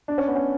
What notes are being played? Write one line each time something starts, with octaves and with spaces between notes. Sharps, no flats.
D4
C#4
B3
C#4